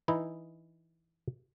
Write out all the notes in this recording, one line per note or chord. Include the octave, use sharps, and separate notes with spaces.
E3 D#4 E4 D#5